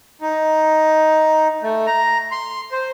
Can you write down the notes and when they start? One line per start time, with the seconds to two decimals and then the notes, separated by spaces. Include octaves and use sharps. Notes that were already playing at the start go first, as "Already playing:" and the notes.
0.21 D#4
1.63 A3
1.87 A#5
2.31 C6
2.72 C5